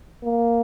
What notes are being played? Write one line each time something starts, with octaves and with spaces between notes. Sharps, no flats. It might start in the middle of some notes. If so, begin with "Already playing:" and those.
A#3